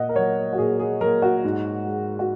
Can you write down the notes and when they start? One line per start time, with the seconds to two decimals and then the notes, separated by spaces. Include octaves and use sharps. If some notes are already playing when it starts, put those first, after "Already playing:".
Already playing: A#2 D#5 F#5
0.09 A#4
0.15 F#3 A#3 C#5
0.53 F#4
0.58 A#2 G#4
0.79 G#4
1.01 F#3 A#3 A#4
1.22 F#4
1.44 G#2
1.87 G#3
2.19 F#4